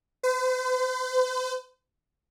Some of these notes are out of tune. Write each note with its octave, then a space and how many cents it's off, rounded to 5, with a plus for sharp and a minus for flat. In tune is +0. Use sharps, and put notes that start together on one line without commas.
C5 -45